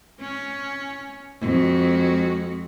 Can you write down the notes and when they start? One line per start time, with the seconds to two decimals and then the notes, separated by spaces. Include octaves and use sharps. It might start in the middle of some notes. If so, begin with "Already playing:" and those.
0.21 C#4
1.41 F2 G#3 F#4